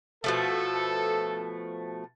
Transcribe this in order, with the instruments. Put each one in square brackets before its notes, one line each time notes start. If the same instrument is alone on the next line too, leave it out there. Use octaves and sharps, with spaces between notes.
[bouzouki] B2 F3 A3 [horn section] A4